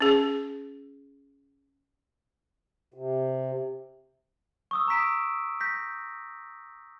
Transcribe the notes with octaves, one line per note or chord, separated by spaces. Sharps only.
C#4 G#4
C3
C#6 D#6 E6
A#5 C#6 E6 B6 D7 E7
G6 A#6 B6